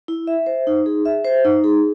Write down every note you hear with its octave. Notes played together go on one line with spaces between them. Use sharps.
E4
E5
C5
D#4
G#4
E5
C5
D#4
G#4